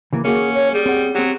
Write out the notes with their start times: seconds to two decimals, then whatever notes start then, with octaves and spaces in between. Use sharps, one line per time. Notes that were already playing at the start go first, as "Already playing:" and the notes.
0.13 C#3 E3 A#3
0.25 A#3 C#4 F#4 G#4
0.54 C#5
0.74 G3 G#4
0.86 C4 F#5
1.15 F#3 C4 G4